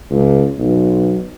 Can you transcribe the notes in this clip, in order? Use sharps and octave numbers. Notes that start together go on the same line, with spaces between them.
C#2
B1